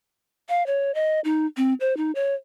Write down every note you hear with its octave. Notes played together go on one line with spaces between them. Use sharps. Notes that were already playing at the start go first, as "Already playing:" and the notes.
F5
C#5
D#5
D#4
C4
C5
D#4
C#5